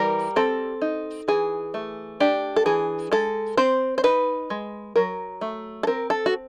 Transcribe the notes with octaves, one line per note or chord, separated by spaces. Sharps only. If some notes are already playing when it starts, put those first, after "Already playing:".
Already playing: E3 G3 A#4
C4 A4
D#4
E3 G#4
A3
D4 G4
A4
E3 G#4
G#3 A4
C4 C5
C5
D#4 B4
G#3
F#3 A#4
A3
A4
C4 A#4
A4
F#4